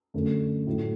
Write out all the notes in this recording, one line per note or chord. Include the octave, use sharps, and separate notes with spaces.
F#2 D3 A3
A2 F#3 A3